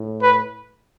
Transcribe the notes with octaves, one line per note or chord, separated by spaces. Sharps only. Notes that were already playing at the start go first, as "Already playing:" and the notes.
Already playing: A2
B4